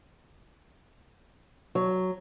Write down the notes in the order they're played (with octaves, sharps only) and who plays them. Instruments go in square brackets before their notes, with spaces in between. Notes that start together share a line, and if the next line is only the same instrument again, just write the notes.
[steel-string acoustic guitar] F#3